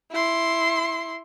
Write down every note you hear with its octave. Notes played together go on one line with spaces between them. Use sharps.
E4 C6